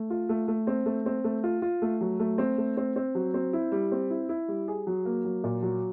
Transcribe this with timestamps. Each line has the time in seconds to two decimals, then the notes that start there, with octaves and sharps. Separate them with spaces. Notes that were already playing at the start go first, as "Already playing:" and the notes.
Already playing: A3
0.10 F4
0.29 A3
0.48 A3
0.67 C4
0.86 A3
1.06 C4
1.24 A3
1.44 F4
1.62 F4
1.82 A3
2.01 F#3
2.20 A3
2.38 C4
2.58 A3
2.77 C4
2.96 C4
3.15 F#3
3.34 C4
3.53 E4
3.72 G3
3.92 C4
4.10 E4
4.29 E4
4.48 G3
4.68 G#4
4.87 F#3
5.05 A#3
5.25 F#3
5.44 A#2
5.63 F#3